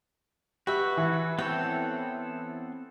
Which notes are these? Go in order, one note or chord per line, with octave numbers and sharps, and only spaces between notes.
F#4 G4 B4 E5
E3
B3 C4 A4 C#5 G5